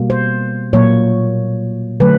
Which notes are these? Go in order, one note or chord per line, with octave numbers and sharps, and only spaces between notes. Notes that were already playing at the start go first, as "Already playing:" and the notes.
Already playing: B2 G3 A#3
C5
A#2 F#3 A#3 C#5
D3 F#3 A3 B4